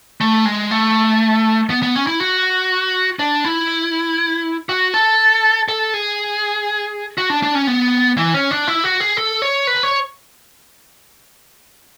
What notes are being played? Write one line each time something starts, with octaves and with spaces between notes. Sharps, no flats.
A3
G#3
A3
B3
B3
C#4
E4
F#4
D4
E4
F#4
A4
A4
G#4
F#4
D4
D4
C#4
B3
E3
C#4
D4
E4
F#4
G#4
A4
C#5
B4
C#5